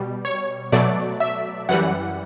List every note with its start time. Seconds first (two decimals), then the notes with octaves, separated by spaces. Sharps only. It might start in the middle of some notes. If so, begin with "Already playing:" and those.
Already playing: B2 G3
0.25 C#5
0.72 B2 F#3 A3 D5
1.20 E5
1.69 F#2 E3 G3 F#5